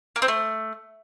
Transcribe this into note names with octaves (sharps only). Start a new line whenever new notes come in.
A#3
C4
A3